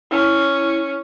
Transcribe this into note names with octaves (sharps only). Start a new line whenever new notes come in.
C#4 E4